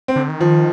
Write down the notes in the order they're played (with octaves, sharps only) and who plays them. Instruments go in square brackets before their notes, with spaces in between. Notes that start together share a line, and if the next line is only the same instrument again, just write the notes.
[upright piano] C4
[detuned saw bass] D3
D#3
[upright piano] F3